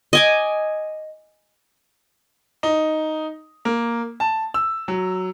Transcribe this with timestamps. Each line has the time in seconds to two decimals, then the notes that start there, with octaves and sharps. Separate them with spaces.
0.13 D#5 G#5 D6
2.63 D#4
3.65 A#3
4.20 A5
4.54 E6
4.88 F#3